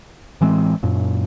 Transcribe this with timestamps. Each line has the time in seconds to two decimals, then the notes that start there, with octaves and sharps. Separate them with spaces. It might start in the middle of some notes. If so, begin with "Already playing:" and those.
0.41 A2 E3 G#3 C4
0.83 F#2 A#2